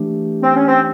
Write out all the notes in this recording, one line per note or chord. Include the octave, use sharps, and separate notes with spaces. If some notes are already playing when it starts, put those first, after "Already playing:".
Already playing: E3 A3 D4 G4
C4
C#4
C4